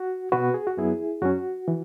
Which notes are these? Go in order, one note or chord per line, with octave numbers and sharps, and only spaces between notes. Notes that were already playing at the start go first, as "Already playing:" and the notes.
Already playing: F#4
B2 B3 F#4 B4
G#4
F#4
F#2 F#3 B3 E4 G#4
F#2 F#3 C#4 F#4
E3